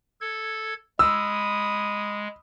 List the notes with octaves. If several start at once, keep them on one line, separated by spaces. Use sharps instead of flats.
A4 G#6
G#3 B5 D#6 E6